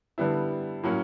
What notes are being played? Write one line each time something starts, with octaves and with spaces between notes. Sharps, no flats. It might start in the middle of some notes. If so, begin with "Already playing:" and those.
D3 G3 B3 E4
A2 F#3 A#3 C#4